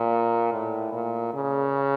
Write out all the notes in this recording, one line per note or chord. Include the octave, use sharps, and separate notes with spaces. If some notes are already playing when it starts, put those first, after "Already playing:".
Already playing: A#2
A2
A#2
C#3